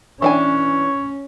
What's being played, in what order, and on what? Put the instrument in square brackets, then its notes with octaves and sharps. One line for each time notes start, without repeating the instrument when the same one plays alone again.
[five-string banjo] E3 D4 G#5 [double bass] C#4 [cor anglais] C#5